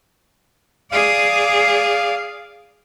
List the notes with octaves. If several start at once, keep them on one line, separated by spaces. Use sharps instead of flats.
G#4 D5 F5